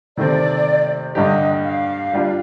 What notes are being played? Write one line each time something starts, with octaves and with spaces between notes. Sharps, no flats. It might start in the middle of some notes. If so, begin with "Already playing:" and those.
C3 D#3 A3 C4 D5
G2 D3 G3 D4 G4 D#5
F5
G3 D4 F4